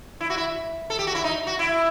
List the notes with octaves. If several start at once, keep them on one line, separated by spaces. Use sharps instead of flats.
E4
F#4
E4
A4
G4
F#4
E4
D#4
F#4
E4